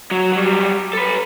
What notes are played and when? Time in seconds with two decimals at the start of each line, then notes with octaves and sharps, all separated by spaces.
0.11 F#3
0.32 F#3 G3
0.93 A4 B4